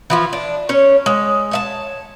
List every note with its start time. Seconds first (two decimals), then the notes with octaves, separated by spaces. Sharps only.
0.10 E3 F3 F4
0.33 D4
0.69 C#4 C#5
1.06 G#3
1.51 C#5 E5 A5